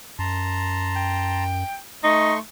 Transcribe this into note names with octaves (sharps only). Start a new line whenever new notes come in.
F#2 A5 A#5 C6
G5
A3 D#4 C6 C#6